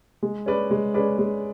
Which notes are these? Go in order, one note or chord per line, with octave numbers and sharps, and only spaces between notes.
G#3
C#4 G#4 B4 D5
G#3
C#4 G#4 B4 D5
G#3